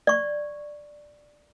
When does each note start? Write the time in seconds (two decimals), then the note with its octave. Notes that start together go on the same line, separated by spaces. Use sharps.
0.07 D5 C#6